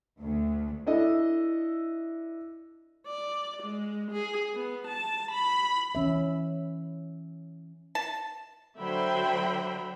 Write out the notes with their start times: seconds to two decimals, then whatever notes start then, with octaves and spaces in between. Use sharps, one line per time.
0.20 D2
0.86 D4 E4 A4 D#5
3.07 D5
3.64 G#3
4.12 G#4
4.54 B3
4.88 A5
5.32 B5
5.95 E3 C#4 E5
7.95 A5
8.78 D3 F#3 C5 E5 G5 B5